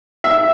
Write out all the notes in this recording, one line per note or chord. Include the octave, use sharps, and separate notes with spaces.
E5